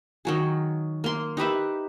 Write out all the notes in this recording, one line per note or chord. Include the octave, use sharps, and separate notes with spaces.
D#3 F#3 G#4
A#3 C6
D#4 G4 B4 E5